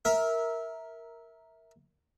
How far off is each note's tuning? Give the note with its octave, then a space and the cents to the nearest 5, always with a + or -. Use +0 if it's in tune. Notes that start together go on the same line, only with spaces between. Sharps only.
A#4 +0 E5 -15